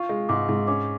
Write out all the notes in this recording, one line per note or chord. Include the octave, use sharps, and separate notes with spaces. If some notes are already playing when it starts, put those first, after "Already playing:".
Already playing: F4 C#6
G#3
G#2 D6
G#2
C#4 D6